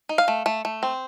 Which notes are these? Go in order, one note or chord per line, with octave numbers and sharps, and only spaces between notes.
D#4
F5
A3
A3
A3
C4